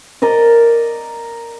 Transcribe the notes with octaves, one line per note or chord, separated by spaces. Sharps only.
A#4 D5 D#5